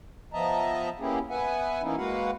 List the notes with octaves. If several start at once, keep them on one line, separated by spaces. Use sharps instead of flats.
F3 B3 D#5 E5 A5 A#5
A#3 B3 C#4 E4 G4 G#4
B3 B4 E5 F#5 G#5
E3 A#3 B3 C#4 D#4 E4
G#3 A#3 F#4 B4 F5 F#5